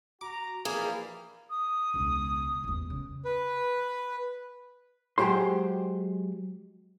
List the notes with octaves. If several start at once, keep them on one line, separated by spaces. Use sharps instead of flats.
F#4 A#5 D6
A#1 E3 G3 A#3 G#4
D#6
E1 C#2
A1 E2
C#3
B4
F#3 G#3 G4 C5 C6